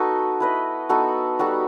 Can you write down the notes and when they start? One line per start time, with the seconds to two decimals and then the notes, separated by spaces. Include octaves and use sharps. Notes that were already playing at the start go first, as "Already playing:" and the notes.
Already playing: B3 D#4 F#4 A4 B4 D#5
0.40 E4 B4 D#5
0.89 B3 D#4 F#4 A4
1.39 G3 D#4 F#4 A4